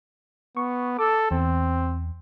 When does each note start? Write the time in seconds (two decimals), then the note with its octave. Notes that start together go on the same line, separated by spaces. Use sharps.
0.57 B3 C#6
0.99 A4 D6 E6
1.31 E2 C4